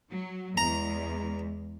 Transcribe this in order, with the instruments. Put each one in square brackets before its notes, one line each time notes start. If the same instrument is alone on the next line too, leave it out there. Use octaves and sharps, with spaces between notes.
[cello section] F#3
[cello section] E2 G#3 [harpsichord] A#5